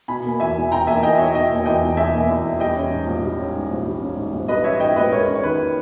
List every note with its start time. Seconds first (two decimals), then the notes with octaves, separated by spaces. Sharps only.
0.08 B2 G#5 B5
0.24 A#3
0.40 E2 E5 G#5
0.56 E1
0.72 B2 G5 A#5
0.87 A#3 E5 G#5
1.03 E2 D#5 G5
1.18 E1 C#5 E5
1.34 B2 D#5 G5
1.50 A#3
1.55 G#5
1.66 E2 D#5 G5
1.81 E1
1.97 B2 E5 G#5
2.13 A#3
2.29 E2
2.44 E1
2.60 G3 D#5 G5
2.76 C#4
2.92 G#2
3.07 A#1
3.23 G3
3.39 C#4
3.55 G#2
3.71 A#1
3.86 G3
4.02 C#4
4.17 G#2
4.33 A#1
4.48 G3 B4 D#5
4.64 C#4 C#5 E5
4.80 G#2 D#5 G5
4.96 A#1 B4 D#5
5.12 G#3 A#4 C#5
5.28 C#4
5.35 C#5
5.43 D#3 B4